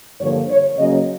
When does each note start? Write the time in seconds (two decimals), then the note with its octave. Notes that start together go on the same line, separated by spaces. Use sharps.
0.20 G2 D3 F3 A#3 C#5
0.49 C#5
0.78 C#3 F#3 A#3 C#4 D#5